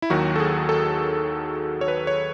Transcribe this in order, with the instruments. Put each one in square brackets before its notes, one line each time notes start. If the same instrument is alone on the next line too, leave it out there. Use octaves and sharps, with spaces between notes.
[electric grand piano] E4
D#2 D#3 F#3 F#4
A4
G#4
A4
C#5
B4
C#5